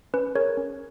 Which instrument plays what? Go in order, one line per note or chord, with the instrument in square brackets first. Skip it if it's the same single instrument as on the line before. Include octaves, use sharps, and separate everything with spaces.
[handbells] C#4 B4
G#4 A#4 C#5
C#4